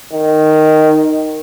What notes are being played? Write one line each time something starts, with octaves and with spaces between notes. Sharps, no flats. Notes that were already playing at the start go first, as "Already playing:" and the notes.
D#3